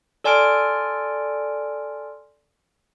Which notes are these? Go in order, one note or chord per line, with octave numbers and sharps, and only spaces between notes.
A4 D5 G#5 C6 F6 D7